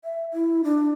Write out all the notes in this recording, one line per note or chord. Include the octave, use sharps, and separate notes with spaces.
E5
E4
D4